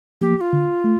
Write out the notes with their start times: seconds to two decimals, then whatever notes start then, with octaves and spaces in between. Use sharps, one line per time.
0.21 F3 A#3 G4
0.37 G4
0.41 F4
0.53 D3
0.84 A3